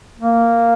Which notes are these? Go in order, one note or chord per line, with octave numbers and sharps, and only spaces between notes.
A#3